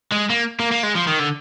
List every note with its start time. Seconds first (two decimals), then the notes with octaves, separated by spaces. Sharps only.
0.11 G#3
0.29 A#3
0.60 A#3
0.72 A#3
0.83 G#3
0.96 F3
1.08 D#3
1.20 D3